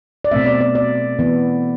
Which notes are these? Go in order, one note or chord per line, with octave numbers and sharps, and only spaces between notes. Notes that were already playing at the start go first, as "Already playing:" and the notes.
D5
B2 A3 C4 E5
D5
D5
D5
E3 B3